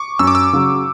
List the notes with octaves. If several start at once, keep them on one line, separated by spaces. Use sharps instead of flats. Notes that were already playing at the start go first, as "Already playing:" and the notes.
Already playing: C#6 D6
F#2 E6
D6
E6
C#3 F#3